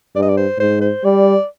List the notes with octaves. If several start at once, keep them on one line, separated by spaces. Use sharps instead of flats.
G2 D5
D#5
D5
C5
G#2 C5
C5
G3 D5